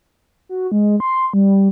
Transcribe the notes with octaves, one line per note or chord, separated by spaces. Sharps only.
F#4
G#3
C6
G3